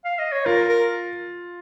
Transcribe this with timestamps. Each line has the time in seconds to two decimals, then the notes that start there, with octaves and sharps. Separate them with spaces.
0.05 F5
0.19 D#5
0.32 C#5
0.46 F4 A#4
0.69 A#4